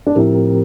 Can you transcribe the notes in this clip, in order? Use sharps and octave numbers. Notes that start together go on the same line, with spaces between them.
D4
A2 F3 C4 E4 G4 A#4